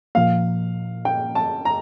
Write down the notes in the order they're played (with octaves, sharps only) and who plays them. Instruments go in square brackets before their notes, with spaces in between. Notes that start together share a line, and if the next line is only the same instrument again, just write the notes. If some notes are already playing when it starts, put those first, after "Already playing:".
[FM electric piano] A#2 F3 A#3 [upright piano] F5
[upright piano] G5
A5
A#5